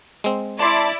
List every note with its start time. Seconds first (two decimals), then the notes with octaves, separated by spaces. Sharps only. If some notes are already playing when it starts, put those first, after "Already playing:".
0.24 G#3 C4
0.59 E4 D5 A5 C6